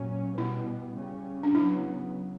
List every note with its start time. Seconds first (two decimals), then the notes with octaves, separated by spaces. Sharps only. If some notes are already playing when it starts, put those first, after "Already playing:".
Already playing: A#2 F#3 C#4
0.37 B2 G3 B3 E4
0.96 C#3 G3 C#4
1.43 D4
1.55 C#3 F#3 B3 E4